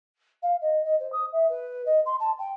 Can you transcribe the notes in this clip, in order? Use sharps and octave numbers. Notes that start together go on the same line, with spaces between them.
F5
D#5
D#5
C5
D#6
E5
B4
D#5
C6
A5
G5